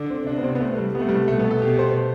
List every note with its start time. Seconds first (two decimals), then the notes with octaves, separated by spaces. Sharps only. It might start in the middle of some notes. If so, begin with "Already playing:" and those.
Already playing: D3 D4
0.10 C4
0.27 C3 D4
0.38 B3
0.44 C4
0.55 B3
0.60 C3 A3
0.78 G3
0.95 C3 B3
1.01 A3
1.09 G3
1.16 A3
1.28 B2 A3
1.39 B3
1.51 A4
1.62 B2 G4
1.79 C5